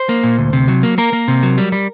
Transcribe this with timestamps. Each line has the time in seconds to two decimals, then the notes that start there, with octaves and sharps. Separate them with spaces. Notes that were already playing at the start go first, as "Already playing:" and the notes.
Already playing: C5
0.09 A#3
0.24 A#2
0.38 D2
0.53 C3
0.68 F#3
0.83 A#3
0.98 A#3 A#4
1.13 A#3
1.28 C3
1.43 F#3
1.58 G3
1.72 G3